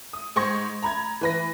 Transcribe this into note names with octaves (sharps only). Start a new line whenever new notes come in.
D#6
G#2 C5 C6 C#6 G#6 A#6
A#5 B5 G#6
E3 B4 A#6